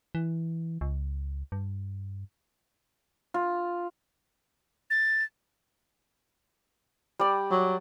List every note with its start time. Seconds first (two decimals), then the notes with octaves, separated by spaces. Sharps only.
0.15 E3
0.81 C#2
1.52 G2
3.34 F4
4.90 A6
7.19 G3 D5
7.51 F#3